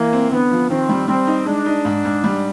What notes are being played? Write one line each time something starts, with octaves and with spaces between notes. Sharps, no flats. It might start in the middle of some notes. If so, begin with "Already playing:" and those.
Already playing: E3 A#3
C4
D3 B3
F3
D#3 C4
G3
G3 C4
D#4
G#3 D4
D#4
G#2
G#2
G3